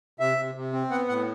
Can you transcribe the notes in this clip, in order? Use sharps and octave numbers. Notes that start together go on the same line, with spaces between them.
C3 E5
C3
C3
C4
B3 F#5
A2 F#5